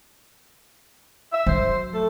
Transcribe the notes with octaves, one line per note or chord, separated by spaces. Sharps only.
E5
F#3 C5
A3 A4